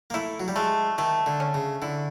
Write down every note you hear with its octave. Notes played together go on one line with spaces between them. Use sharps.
A#3
A3 E4
F#3
G3
G#3 A3
D#3 A3
D3
C#4
C#3
D3 E4